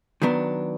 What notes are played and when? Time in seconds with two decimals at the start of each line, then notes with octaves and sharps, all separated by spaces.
0.22 D#3 F#3 B3 D4